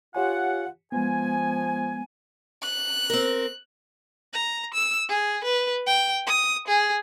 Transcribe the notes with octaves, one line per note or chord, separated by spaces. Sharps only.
F4 G4 C#5 F#5 G#5
F3 G#3 B3 G#5
F#6
C4 A#4
A#5
E6
G#4
B4
G5
D#6
G#4